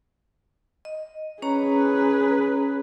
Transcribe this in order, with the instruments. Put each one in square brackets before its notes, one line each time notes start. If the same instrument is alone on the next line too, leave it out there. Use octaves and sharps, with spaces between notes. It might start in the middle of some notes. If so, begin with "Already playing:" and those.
[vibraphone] D#5
[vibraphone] C#4 C#5 A#5 [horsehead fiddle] G#4 B4